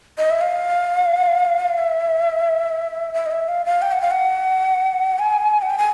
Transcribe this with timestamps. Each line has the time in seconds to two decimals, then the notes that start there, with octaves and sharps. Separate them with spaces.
0.18 D#5
0.30 E5
0.41 F5
1.78 E5
3.14 E5
3.26 D#5
3.31 E5
3.48 F5
3.66 F5
3.82 G5
3.92 F#5
4.01 F5
4.11 F#5
5.19 G#5
5.62 F#5
5.70 G5
5.78 G#5